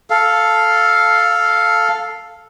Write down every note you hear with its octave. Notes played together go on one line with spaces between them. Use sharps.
A4 F5